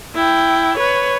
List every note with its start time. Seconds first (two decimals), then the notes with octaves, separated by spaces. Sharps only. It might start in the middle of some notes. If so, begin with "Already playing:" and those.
0.16 E4 G5
0.77 B4 C#5